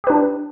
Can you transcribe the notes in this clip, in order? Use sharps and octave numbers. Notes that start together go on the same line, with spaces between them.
D4 G4 B4